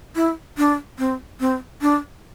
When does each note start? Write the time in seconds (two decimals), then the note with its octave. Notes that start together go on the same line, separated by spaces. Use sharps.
0.16 E4
0.58 D4
0.99 C4
1.40 C4
1.82 D4